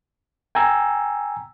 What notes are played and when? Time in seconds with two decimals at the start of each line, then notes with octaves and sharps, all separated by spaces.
0.55 G5 G#5 A#5 E6